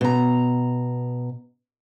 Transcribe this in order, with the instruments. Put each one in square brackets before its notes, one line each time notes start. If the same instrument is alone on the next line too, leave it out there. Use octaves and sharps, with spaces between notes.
[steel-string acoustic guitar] B2 A#5